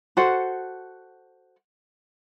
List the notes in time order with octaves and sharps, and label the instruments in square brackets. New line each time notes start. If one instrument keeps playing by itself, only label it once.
[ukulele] F#4 A4 C5 F#5